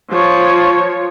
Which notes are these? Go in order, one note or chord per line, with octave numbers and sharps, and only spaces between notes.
F3 C#5